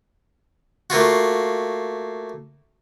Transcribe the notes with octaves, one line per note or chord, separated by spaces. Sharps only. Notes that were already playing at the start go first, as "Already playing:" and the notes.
A3 A#3 F4 F#4